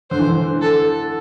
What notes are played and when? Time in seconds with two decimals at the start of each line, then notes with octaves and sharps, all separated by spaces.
0.11 D3 C5
0.19 E3
0.27 D3
0.62 A4